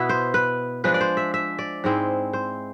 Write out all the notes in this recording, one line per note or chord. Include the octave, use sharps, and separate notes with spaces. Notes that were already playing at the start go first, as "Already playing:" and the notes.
Already playing: B2 B3 E4 E5
C5
B4
F3 G#3 D4 B4
D5
C5
E5
E5
D5
G#2 G#3 C4 E4
C5